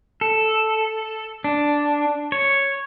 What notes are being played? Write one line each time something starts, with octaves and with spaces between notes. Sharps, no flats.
A4
D4
C#5